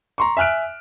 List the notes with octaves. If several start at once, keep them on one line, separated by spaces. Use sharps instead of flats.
A#5 C6 C#6
E5 G#5 F6 F#6 D7